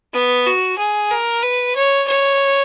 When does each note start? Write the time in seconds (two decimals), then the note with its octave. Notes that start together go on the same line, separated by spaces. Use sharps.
0.13 B3
0.46 F#4
0.78 G#4
1.11 A#4
1.42 B4
1.75 C#5
2.07 C#5